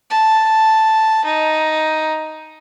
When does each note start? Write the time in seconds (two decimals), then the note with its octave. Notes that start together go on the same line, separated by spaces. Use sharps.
0.10 A5
1.25 D#4